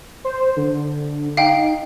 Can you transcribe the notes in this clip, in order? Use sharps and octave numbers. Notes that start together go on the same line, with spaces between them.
C5
D3
D#4 F5 G5